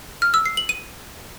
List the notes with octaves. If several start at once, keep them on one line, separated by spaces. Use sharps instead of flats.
F6
E6
C7
F#7
D#7